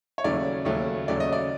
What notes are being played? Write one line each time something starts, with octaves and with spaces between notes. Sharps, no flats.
C#5
D#2 C#3 F#3 A3 C#4 D5
D#2 C#3 F#3 A3 C#4
D#2 C#3 F#3 A3 C#4 D5
D#5
D5